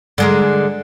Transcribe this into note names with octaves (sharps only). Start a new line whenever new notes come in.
D3 G#3 A#4